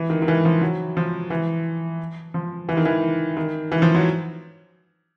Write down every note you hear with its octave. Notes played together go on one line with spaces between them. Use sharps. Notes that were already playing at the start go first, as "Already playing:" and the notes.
Already playing: E3
D#3
D#3
E3
F3
F#3
F3
E3
F3
E3
D#3
E3
D#3
E3
F3
F#3